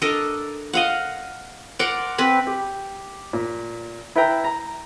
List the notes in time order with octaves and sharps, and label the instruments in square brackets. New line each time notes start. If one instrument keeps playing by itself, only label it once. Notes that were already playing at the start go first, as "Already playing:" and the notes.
[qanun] D4 A4 A#4 D#5
D#5 F5 F#5
A#4 D5 F#5 C6
C4 B4 B5
[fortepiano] G4
A#2
E4 B4 E5 G5 A#5
A#5